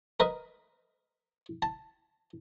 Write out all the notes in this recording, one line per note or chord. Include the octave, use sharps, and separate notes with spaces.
A#4 B4 D#5
A5